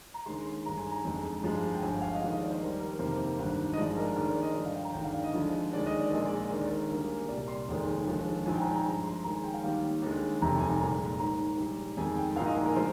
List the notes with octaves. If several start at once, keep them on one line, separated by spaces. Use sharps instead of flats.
A#5
D#2 D3 G#3 C6
C6
G#1 G2 D3 G#3 A#5
G#5
A#5
F2 D3 G#3
G2 F3 G#3
G5
G1 G2 F3 G#5
F5
D#5
D#2 D3 F3 G#3 F5
D#5
D5
C5
D#2 D#3 G3 A#4
A#4
A#4
F2 C3 D#3 G3 A#3 C5
G#1 G2 D3
D#5
G2 F3 G#3 D5
A#4
D#2 D3 G#3 A#4
D5
D#5
G2 D3 F3 D#5
F5
G5
A#5
G#1 G2 D3 G#3 G5
F5
D5
D#5
D2 D3 F3 G#3
D#2 D3 G#3 D5
D#5
D5
A#1 A#2 G#3 D#5
D5
D#2 D3 G#3 A#4
A#4
D2 D3 G3 A#3 A#4
G#4
A#4
C2 A#2 G3 D5
C6
F1 D#2 D#3 G#3
D#2 D3 F3 G#3
A#1 G#2 F3 G#5
G5
A#5
G#5
A#5
G2 D3 F3 G#3 A#5
C6
D#2 D#3 G#3 A#5
G#5
G5
F5
D#2 D#3 G3 A#3
D#2 D3 G#3
F1 F2 C3 D#3 A#5
G#5
C2 A#2 G#3 A#5
D#2 D#3 G#3 A#5
A#1 G#2 G3
F2 D#3 G#3 G#5
G5
A#1 G#2 F3 A#3 F5
D#5
G#4
A#4
D3 F3 G#3 C5